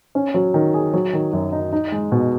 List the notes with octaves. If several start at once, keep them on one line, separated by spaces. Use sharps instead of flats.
C#4
F#3
D#3
G#4
F#3
D#3
F#2
D#4
D#4
G#3
B2